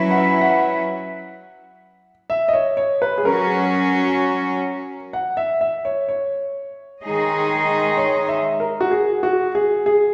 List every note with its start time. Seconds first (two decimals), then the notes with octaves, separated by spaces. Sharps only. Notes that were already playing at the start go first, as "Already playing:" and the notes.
Already playing: F#3 C#4 E4 B4
0.10 F#5
0.17 E5
0.41 F#5
2.30 E5
2.48 D#5
2.53 C#5
2.77 C#5
3.02 B4
3.18 G#4
3.25 F#3 C#4 F#4 A#4
5.13 F#5
5.37 E5
5.61 E5
5.85 C#5
6.09 C#5
7.03 D#3 G#3 D#4 G#4 D#5
7.97 C#5
8.28 E5
8.60 A#4
8.81 F#4
8.91 G#4
9.23 F#4
9.55 G#4
9.86 G#4